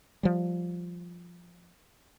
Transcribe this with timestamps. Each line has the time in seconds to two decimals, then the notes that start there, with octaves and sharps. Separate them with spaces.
0.23 F3 G3